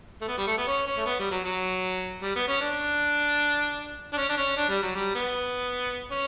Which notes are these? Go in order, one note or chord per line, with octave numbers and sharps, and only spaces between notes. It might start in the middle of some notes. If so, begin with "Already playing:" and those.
A3
B3
G3
A3
B3
C#4
C#4
A3
B3
G3
F#3
F#3
G3
B3
C#4
D4
D4
C#4
D4
C#4
D4
G3
F#3
G3
B3
C#4